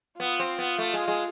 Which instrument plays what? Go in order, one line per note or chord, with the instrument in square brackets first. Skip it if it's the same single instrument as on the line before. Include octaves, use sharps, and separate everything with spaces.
[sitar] B3 [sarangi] F4
[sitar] C4
B3
A3
G#3
G#3